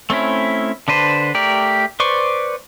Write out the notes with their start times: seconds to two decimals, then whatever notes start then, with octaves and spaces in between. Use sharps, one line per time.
0.10 A3 C4 C#4 E4
0.88 D3 D4 B4 C5
1.35 A3 G4 A#4 D5
2.00 B4 C5 D5 C#6